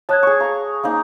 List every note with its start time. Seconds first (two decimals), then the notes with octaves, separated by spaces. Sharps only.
0.09 C#5 D#5 A5 F#6 G#6
0.23 G#4 C#6
0.40 F5 A#5 C#6
0.83 A#3 C#4 D#4